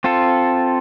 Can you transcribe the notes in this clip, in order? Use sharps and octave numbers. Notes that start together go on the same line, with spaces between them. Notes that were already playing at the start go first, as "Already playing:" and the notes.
C4 F4 A4